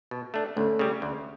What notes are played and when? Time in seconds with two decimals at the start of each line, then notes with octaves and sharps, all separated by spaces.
0.11 B2
0.34 A3 D4
0.56 D2 A3 C#4
0.79 C#3 G3
1.02 D2